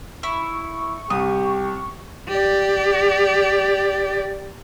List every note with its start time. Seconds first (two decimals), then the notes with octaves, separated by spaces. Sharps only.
0.23 E4 C#6
1.10 C2 G4 D#6
2.29 G4 D5